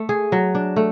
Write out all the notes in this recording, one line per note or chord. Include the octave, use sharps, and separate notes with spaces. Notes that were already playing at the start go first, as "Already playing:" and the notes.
Already playing: A3
G#4
F#3
D4
A3